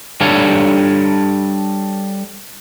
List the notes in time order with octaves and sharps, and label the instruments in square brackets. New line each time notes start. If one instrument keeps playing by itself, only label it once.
[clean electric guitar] G3 D4 A4 C#5 F5